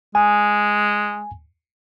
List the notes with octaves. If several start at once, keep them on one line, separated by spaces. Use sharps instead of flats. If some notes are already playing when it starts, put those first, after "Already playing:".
G#3 G#5